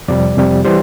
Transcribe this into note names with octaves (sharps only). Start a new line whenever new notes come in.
F2 C3 G3 D5
F2 C3 G3
E3 G3 C5